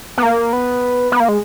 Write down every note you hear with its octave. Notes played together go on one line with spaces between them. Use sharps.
B3
A#3
B3
B3
A#3
G#3